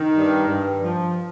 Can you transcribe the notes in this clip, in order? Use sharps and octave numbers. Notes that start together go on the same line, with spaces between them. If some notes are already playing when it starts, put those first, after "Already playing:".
Already playing: D#3
G2
G2
F3